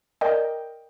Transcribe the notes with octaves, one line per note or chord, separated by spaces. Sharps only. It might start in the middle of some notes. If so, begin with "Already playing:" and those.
A#4 D5 D#5 G5